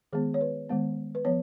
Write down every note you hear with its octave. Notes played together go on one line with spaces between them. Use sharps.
D#3 G#3 B3 G#4
C#5
B4
D#3 G#3 B3
B4
F3 B3 C#5